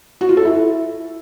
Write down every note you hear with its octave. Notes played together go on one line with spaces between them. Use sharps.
F#4
F4
A4
E4